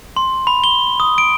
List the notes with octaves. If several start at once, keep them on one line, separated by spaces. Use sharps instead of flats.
C6
B5
G7
D#6
D7